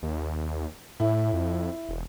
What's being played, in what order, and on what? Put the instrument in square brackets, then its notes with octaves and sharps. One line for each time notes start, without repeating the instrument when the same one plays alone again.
[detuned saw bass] D#2
[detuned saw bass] A2 [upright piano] E4
[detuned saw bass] F2
E1